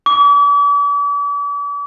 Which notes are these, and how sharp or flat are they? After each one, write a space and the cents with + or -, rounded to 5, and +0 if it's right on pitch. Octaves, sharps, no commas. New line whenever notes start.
D6 -40